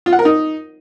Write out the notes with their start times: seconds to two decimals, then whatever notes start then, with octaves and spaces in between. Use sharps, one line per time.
0.06 F4
0.12 F#5
0.19 A#4
0.25 D#4